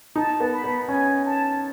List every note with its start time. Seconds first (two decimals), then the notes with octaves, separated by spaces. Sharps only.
0.16 D#4 A5
0.40 B3
0.51 B5
0.64 B3
0.88 C#4 G#5
1.26 A5